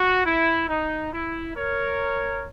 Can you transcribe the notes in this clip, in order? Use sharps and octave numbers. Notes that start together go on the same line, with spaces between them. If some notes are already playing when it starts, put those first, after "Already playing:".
Already playing: F#4
E4
D#4
E4
A#4 C#5